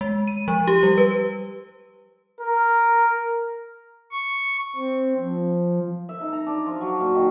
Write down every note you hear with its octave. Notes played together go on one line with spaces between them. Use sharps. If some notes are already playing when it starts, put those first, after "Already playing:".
G#3
D#7
F3
G4
G3
B4
A#4
C#6
C4
F3
E5
D#4
A#5
D4
F3
F#3
A#2
D#3